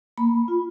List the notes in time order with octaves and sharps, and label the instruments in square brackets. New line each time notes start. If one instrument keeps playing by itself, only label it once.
[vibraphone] A#3 B5
F4